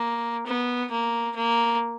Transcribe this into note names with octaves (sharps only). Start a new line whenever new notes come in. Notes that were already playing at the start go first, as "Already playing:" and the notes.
Already playing: A#3
B3
A#3
A#3